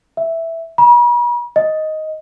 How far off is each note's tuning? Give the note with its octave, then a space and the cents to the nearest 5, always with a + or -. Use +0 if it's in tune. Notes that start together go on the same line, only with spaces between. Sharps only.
E5 +0
B5 -45
D#5 +5